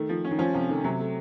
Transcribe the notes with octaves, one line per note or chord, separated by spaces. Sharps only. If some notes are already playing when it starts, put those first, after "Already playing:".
Already playing: D#3 A3
F3
C#4
D#3
F3 C#4
C3 F3
D#3 A3
C3 F#3
A3